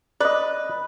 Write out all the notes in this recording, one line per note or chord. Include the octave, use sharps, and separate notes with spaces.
B4 D5 D#5